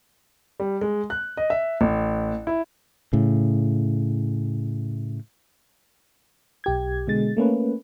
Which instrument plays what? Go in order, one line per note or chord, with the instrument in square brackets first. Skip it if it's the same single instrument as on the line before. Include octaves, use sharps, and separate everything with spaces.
[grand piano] G3
G#3
F#6
D#5
E5
A1
E4
[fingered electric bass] A2 C#3
[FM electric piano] B1 G4 G#6
B2 D3 G#3 A6
A3 A#3 C#4 B4